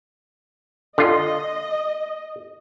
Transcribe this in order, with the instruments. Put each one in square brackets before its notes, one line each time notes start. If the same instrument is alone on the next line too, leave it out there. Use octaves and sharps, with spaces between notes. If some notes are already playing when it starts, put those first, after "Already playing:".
[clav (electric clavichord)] D3 F4 [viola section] D#5